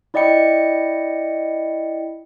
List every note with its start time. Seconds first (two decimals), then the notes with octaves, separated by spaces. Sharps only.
0.14 E4 D5 D#5 G5 C#7